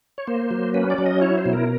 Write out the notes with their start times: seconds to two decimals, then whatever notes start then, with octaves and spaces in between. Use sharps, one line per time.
0.18 C#5
0.27 A#3 C5
0.51 F#3
0.74 C#4 B4
0.90 D5
0.98 F#3
1.06 D#5
1.22 E4 C#5
1.38 C5
1.46 B2
1.53 A#4